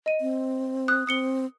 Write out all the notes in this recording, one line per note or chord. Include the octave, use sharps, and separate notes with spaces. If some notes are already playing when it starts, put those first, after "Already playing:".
D#5 D#7
C4
D#6 F#6
C4 D#6 C#7 G7